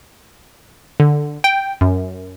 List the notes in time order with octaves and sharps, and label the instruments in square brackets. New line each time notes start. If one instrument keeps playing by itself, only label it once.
[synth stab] D3
G5
F#2